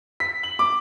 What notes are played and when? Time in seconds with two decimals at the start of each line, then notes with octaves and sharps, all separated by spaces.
0.20 B6
0.43 F#7
0.59 D6